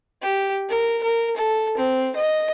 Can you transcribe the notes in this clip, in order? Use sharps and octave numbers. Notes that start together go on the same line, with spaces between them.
G4
A#4
A#4
A4
C4
D#5